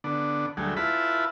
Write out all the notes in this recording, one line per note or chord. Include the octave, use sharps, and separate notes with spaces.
D3 B3 D4
D2 F#3 G3 A3 G#4
E4 F4 B4 E5 A5 B5